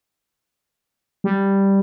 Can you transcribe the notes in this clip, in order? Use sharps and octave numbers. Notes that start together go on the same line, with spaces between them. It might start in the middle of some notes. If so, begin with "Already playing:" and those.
G3